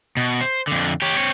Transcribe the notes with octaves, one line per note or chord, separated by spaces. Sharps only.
B2
C5
F2 D3
G4 C#5
C4 C#5